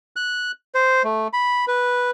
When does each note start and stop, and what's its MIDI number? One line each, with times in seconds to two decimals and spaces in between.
0.16 0.51 90
0.75 1.03 72
1.04 1.28 57
1.33 1.65 83
1.68 2.11 71